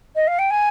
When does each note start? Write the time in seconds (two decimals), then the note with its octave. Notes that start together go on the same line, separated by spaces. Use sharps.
0.15 D#5
0.27 F5
0.39 G5
0.50 G#5